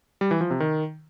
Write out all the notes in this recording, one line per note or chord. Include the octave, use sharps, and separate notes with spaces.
G3
E3
F3
C3
D#3